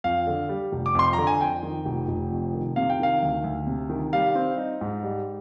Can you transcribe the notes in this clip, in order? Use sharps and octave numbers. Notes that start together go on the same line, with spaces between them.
F2 F5
D3
G3
F1
D6
F2 C6
D3 A#5
G#5
F2 G5
D#3
F1
F1
F2
D#3
C3 F5
G5
D#3 F5
D2
D2
C3
D#3
G3 F5
C4
D#4
G#2
G3